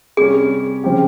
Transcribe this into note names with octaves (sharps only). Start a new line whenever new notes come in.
C3 G3 C#4 G#4
C#3 F3 C4 G4